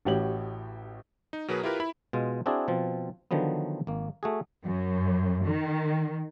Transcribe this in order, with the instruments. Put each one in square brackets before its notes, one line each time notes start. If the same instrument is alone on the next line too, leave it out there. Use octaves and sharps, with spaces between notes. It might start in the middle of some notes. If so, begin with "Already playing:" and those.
[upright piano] A1 A2 F#4 G4 C#5 F#7
[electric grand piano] D#4
B2 F#3 G#4 A#4 B4
E4 F4 G4 A#4 B4
E4 B5
[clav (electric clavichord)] B2 G#3 F4
C4 D4 E4 F#4 G#4 D5
B2 F3 C4
D3 D#3 F3 F#3 B3
G#1 A#3
A3 F#4 G#4
[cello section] F#2
D#3